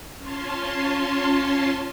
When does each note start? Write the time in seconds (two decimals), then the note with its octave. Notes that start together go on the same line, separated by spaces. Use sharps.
0.16 C#4 F4 C#5 A5 C6